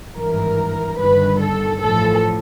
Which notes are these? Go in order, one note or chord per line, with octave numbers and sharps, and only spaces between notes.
G#1 G2 E3 A#4
G1 G2 D#3 B4
A4
A1 A2 F3 A4